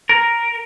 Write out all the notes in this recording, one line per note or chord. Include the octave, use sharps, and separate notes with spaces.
A#4